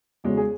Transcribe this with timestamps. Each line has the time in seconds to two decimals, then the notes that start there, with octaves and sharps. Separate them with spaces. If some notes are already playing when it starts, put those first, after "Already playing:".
0.24 E2 C#3 G#3 F#4
0.37 G#4